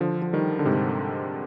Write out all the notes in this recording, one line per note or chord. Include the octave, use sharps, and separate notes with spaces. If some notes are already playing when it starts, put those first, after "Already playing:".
D3 F3
F3
D#3 G3
D3
G#2 C3